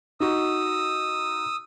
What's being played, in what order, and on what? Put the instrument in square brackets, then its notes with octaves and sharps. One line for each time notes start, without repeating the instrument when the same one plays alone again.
[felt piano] D#4 F#4 [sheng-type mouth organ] D#6 E6